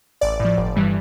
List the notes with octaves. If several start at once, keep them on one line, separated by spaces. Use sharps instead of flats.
A1 D5
A2 F3
G1
G2 E3 G3